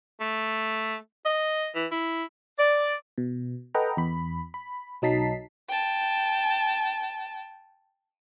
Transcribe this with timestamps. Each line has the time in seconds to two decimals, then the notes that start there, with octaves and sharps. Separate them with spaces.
0.21 A3
1.26 D#5
1.75 E3
1.92 E4
2.58 D5
3.18 B2
3.75 A4 B4 D#5 F#5 G5 A#5
3.97 E2 B5
4.54 B5
5.02 B1 F#3 D#4 A5 B6 C7
5.69 G5 A5